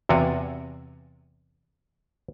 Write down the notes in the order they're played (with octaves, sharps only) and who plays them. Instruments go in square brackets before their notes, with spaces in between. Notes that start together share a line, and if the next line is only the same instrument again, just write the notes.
[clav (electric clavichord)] E2 C3 F#4 D5 F5 G#5